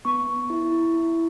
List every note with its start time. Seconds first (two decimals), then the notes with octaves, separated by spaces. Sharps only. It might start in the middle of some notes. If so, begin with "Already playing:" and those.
0.05 B3 C#6
0.27 B3
0.50 E4
0.72 E4
0.94 E4